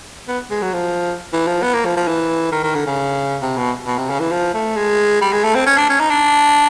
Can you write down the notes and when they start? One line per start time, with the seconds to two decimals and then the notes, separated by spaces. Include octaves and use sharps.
0.28 B3
0.50 G#3
0.62 F#3
0.73 F3
1.33 E3
1.47 F3
1.63 B3
1.74 A#3
1.85 F3
1.96 F3
2.07 E3
2.52 D#3
2.63 D#3
2.75 D3
2.86 C#3
3.42 C3
3.57 B2
3.87 B2
3.98 C3
4.09 C#3
4.20 E3
4.32 F3
4.54 A3
4.76 G#3
5.21 G3
5.32 G#3
5.44 A3
5.55 C4
5.66 C#4
5.77 D4
5.89 C#4
6.00 D#4
6.10 D4